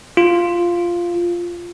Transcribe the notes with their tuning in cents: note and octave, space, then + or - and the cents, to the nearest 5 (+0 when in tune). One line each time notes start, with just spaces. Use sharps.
F4 -5